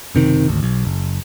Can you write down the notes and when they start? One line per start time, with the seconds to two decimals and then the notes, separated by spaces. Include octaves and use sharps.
0.15 F#1 C3 D#3
0.48 G#1 D2
0.63 B1
0.85 F#1